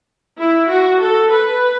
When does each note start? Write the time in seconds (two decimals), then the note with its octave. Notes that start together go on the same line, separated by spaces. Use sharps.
0.37 E4
0.68 F#4
1.00 A4
1.31 B4